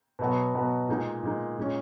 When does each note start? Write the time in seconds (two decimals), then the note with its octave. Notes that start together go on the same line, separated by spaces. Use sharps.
0.19 B2 F#3 B3 F#4
0.54 B2 F#3 B3 F#4
0.88 A#2 G#3 D#4
1.23 A#2 G#3 D#4
1.58 A#2 G#3 C#4